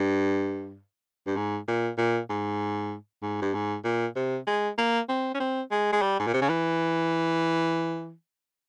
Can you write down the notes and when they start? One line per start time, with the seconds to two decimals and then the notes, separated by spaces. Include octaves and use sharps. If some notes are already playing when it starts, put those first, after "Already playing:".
Already playing: G2
1.27 G2
1.37 G#2
1.68 A#2
1.98 A#2
2.30 G#2
3.22 G#2
3.42 G2
3.55 G#2
3.85 A#2
4.16 C3
4.47 G#3
4.78 A#3
5.09 C4
5.35 C#4
5.40 C4
5.71 G#3
5.93 G#3
6.02 G3
6.20 G#2
6.27 A#2
6.34 C3
6.42 C#3
6.49 E3